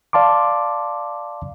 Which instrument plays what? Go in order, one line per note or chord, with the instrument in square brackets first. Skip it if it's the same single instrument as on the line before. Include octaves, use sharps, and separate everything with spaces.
[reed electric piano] D5 F5 A5 C6 D6